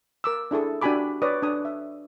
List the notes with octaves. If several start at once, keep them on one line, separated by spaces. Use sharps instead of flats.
A#4 D6 E6
D4 E4 G#4 A4
D4 F#4 G4 G#5 B5 D6
B4 C#5 D5 D#6
D4 D#6
E5